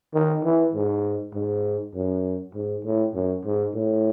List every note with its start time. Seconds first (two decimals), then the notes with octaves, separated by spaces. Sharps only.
0.14 D#3
0.44 E3
0.75 G#2
1.34 G#2
1.95 F#2
2.55 G#2
2.85 A2
3.15 F#2
3.45 G#2
3.75 A2